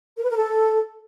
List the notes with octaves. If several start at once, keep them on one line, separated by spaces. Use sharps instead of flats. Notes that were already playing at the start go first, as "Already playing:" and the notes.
A#4
B4
A#4
A4